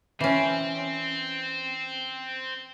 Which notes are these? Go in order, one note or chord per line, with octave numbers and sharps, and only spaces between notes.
E3 C4 C#4